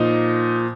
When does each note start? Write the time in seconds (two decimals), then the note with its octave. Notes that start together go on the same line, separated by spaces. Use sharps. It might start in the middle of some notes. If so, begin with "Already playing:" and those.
Already playing: A#2 F3 D#4